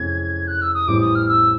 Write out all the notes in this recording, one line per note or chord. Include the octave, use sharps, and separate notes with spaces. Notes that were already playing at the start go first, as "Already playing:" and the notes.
Already playing: F2 C3 E3 G#3 C#4 G#6
F#6
E6
D#6
A1 A2 E3 G3 C4 D6
D#6
F6
E6